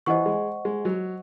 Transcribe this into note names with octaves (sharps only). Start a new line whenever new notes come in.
E3 C5 D#5 F#5 C#6
G#3
G#3
F#3